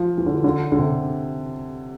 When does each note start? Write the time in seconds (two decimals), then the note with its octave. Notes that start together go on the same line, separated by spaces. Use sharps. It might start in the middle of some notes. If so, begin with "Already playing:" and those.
Already playing: F3
0.18 E3
0.26 D3
0.35 E3
0.44 D3
0.72 D3
0.78 C3